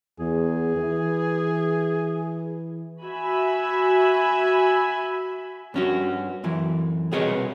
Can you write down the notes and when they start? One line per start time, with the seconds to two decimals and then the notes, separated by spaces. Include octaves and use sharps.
0.19 E2 G#4
0.76 E3
3.03 F#4 E5 G#5 B5
5.74 G2 C#4 F#4
6.44 F#2 E3
7.12 C2 B2 G#4 B4 C#5 D#5